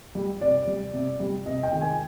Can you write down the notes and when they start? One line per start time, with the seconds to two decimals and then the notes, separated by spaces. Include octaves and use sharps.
0.15 G3
0.41 C3 D5
0.67 G3
0.94 C3
1.20 G3
1.46 C3 D#5
1.63 G5
1.72 D#3 G#3
1.81 G#5